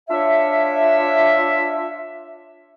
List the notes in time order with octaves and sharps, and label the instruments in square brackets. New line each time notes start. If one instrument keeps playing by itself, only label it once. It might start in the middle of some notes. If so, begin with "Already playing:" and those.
[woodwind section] D4 F4 C#5 E5